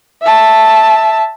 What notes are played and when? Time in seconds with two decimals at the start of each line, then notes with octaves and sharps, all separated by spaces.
0.22 E5 A5